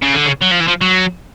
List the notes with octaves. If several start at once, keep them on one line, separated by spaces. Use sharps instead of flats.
C#3
D3
C#3
F#3
F3
E3
F3
F#3